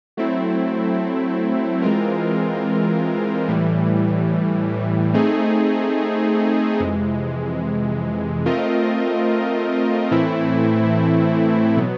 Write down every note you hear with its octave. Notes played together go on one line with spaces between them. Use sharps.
F#3 A3 C4 E4
E3 G#3 C4 F4 A#4
A2 E3 G3
A3 C4 D#4 G#4
F2 C3 E3 G#3
A3 C4 F4 A#4 D#5
A2 E3 A3 C4 E4
B2 F#3 B3